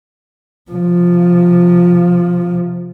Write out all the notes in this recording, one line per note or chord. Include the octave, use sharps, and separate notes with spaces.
C3 F3